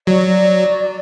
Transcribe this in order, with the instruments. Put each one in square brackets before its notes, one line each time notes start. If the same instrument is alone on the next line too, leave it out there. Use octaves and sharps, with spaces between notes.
[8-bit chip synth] F#3 [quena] D5